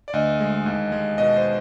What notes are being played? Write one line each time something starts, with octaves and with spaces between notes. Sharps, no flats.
D5
D2 D#5
G#3
D#2
G#3
B2 D#5
C5